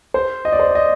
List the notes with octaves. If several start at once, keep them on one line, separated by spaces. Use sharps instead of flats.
C5
D#5
D5
C5
D5
D#5